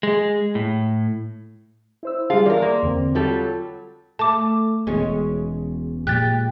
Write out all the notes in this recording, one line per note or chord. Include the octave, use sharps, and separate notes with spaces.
G#3
A2
E4 C5 E6
G3 D4 F4 G4 G#4 F5
E2 A#4 D5 C6
A#3
E2 D3 C4
F#3 G3 F4 A4
A3 A5 D6
E1 E2 B2 G#3 C#4
A#2 F3 G#3 G4 F#6 A6